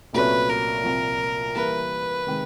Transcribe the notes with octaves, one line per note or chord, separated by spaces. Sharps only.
C2 A#2 F#3 A3 C#4 B4
A#4
C2 A#2 F3
E3 G3 A#3 B4
C3 D#3 G#3